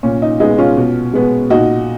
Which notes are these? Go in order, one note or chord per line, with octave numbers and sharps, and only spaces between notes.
A#2 C#4
D#4
G#3 B3 D#4
C#4 F4
B2
G#3 B3
A#2 D#4 F#4